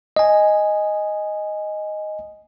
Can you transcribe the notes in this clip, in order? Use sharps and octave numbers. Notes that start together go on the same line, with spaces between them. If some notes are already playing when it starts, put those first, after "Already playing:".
D#5 G#5